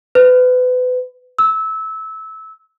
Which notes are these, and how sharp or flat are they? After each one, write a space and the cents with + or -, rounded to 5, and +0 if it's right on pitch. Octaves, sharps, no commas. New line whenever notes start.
B4 +30
E6 -20